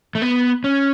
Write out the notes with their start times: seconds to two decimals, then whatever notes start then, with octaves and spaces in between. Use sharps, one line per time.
0.15 A3
0.22 B3
0.64 C#4